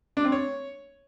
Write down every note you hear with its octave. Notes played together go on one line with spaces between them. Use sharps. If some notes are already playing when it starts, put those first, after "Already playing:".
D4
C4
C#5